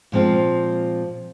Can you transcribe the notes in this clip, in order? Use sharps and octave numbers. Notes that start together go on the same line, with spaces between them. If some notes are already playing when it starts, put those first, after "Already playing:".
A#2 F3 G#3 C4 F4